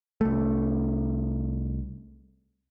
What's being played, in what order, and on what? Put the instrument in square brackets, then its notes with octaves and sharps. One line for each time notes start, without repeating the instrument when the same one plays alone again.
[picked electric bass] C2 A3